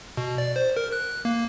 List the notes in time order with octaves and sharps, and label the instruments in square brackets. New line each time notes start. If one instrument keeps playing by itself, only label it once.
[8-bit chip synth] B2
D5
C5
A#4
F#6
A#3